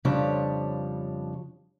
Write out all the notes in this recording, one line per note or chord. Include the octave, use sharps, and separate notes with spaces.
F2 C#3 F3 G3 D4 C#5